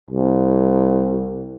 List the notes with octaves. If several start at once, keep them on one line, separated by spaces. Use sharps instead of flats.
C2